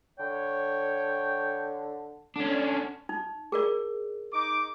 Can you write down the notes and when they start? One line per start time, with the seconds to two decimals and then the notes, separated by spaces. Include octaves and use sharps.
0.19 D3 C#5 G5
2.36 D3 C#4 D4
3.09 D#4
3.52 G#4 A#4 D5
4.32 D#4 D6